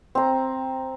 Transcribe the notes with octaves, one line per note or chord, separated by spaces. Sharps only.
C4 A#5